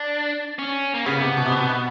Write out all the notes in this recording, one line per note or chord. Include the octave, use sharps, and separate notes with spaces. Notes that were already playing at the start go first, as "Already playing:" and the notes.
Already playing: D4
C#4
A#3
C#3 B3
C3
B2
C3
B2